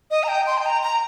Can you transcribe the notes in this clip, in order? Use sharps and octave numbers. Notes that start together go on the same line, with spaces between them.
D#5
A#5
G5
C6
G5
A#5
A#5